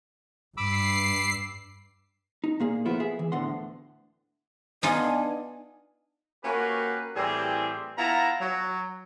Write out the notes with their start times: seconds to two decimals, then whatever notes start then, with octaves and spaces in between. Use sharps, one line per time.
0.57 G2 B5 D6 E6 C7
2.44 D#4
2.60 A#2 A#3 G#4
2.85 F3 A#3 B3 E4 F4 A4
3.00 G#4 E5
3.19 E3
3.32 D2 A2 D3 B3 F#5 C6
4.83 B3 D4 D#4 F4 D#5 G#5
6.43 A#3 C#4 F#4 G4 A#4 B4
7.15 A2 E3 G3 C4 G4 G#4
7.97 B3 E4 F4 A5 A#5
8.40 F#3